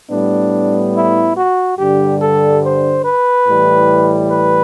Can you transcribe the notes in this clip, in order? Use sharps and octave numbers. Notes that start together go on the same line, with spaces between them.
A2 G3 B3 D4
E4
F#4
G2 D3 G3 G4
A4
C5
B4
A2 E3 G3
B4